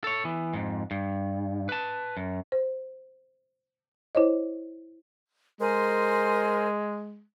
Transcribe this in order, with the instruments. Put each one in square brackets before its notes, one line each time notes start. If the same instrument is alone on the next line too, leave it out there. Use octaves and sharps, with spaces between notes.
[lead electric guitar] A4 C#5
E3 B3
F2 G#2
G2
B4 A5
F#2
[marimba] C5
E4 C5 C#5 D#5
[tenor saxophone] G#3 [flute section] A#4 C5 G#5